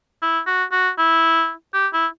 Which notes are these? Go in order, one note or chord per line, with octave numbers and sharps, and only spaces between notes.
E4
F#4
F#4
E4
G4
E4